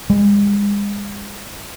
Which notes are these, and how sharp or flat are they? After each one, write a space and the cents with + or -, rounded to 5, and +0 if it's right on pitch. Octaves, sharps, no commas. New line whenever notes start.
G#3 -35